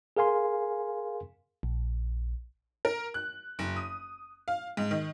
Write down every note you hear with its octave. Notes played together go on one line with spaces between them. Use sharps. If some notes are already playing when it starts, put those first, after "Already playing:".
G#4 A#4 F5 G#5 C6
A#1
A#4
F#6
F#1
D#6
F5
G#2
D#3